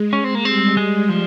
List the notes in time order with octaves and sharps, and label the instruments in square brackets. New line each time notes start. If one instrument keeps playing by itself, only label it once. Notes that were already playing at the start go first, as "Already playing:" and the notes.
Already playing: [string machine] G#3
[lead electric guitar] C#4
C4
A#3
[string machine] G3 [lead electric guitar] C4
[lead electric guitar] G#3
F3